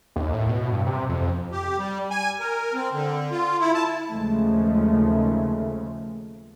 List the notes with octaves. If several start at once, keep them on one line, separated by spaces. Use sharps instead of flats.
D#2
A2
B2
G2
C3
F2
G4
G3
G#5
A#4
C4
D3
F4
E4
A5
D#2 C#3 F3 G#3 A3